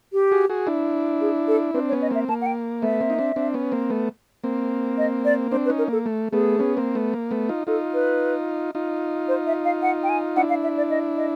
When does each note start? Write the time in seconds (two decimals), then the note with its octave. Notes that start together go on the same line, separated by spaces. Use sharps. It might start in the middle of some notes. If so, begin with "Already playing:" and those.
0.13 G4
0.32 F#4 G#4
0.50 F#4 G#4
0.67 D4 E4
1.21 G#4
1.48 A4
1.74 C4 D4 B4
1.89 C#5
1.92 B3 C#4
2.02 D#5
2.11 A#3 C4 E5
2.28 A#3 A5
2.41 F#5
2.46 G5
2.82 A3 B3 E5
3.00 A#3 C4
3.10 D#4
3.18 C4 D4
3.36 C4 D4
3.54 B3 C#4
3.72 A#3 C4
3.90 A3 B3
4.43 A#3 C4
4.98 D#5
5.25 D5
5.51 C4 D4 C5
5.65 B4
5.69 C#4 D#4
5.78 A#4
5.88 A#3 A4
6.06 A3
6.32 A3 B3 G#4
6.59 B3 C#4
6.77 A#3 C4
6.95 A3 B3
7.13 A#3
7.31 A3 B3
7.49 D#4 F4
7.67 D#4 F4 A4
7.94 B4
8.75 D#4 F4
9.28 C5
9.47 E5
9.65 F5
9.82 F#5
10.03 G5
10.09 G#5
10.36 D4 E4 F#5
10.49 F5
10.63 E5
10.77 D5
10.90 D#5
11.17 D#5